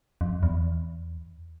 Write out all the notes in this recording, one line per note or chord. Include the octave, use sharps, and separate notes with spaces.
F2
E2